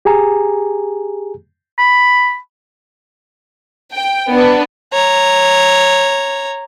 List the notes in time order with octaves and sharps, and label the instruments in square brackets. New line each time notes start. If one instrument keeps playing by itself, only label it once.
[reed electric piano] G4 G#4 G#5 A#5
[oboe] B5
[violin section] G5
B3 D4 B4
[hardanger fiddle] C#5 A#5